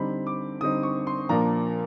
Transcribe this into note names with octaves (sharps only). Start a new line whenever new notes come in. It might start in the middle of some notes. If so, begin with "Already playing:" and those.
Already playing: D3 G3 C4 D#4 B5
D6
D3 G3 C4 D#4 D#6
C#6
C6
A#2 F3 A#3 D4 A#5